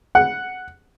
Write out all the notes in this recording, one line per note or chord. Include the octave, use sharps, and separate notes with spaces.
F#5